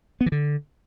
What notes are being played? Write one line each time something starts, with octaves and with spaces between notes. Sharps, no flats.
B3
E3
D3